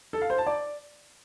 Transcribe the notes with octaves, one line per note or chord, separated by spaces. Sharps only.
A4
F5
C5
A5
D5